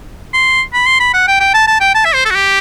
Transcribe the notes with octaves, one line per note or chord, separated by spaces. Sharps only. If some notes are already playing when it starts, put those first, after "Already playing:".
C6
B5
C6
B5
F#5
G5
G5
A5
A5
G5
A5
E5
C5
A4
F#4
G4